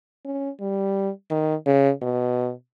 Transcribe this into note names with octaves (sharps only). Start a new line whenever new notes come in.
C#4
G3
D#3
C#3
B2